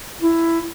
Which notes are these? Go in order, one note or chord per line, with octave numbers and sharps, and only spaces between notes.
E4